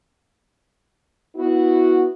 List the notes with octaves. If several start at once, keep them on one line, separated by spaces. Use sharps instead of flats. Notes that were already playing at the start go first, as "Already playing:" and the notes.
B3 E4 F#4